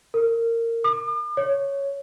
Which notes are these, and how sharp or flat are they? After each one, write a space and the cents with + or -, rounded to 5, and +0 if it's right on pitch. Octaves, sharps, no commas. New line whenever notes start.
A#4 -20
D6 +45
C#5 +5